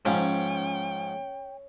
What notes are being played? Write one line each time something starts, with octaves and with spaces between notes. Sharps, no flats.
G#2 F3 C#4 G5